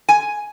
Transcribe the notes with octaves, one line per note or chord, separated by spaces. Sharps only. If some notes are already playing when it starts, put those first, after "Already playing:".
G#5